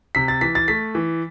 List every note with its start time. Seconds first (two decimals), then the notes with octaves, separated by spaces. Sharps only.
0.15 C3 B6
0.28 A6
0.41 E3 B6
0.55 A6
0.68 A3 B6
0.95 E3